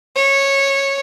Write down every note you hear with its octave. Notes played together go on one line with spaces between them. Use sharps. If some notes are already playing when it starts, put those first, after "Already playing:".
C#5